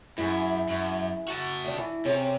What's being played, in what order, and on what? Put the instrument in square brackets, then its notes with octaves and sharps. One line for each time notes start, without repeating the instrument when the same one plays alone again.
[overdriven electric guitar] F#2 [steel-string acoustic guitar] E4 G#4
[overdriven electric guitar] F#2
F#4 A5
[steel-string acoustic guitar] C3 D#3 D4
E3
[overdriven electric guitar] C3 [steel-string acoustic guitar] C#4 G#4 C#5